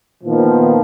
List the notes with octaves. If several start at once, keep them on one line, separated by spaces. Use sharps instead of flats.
A#2 D#3 F3 B3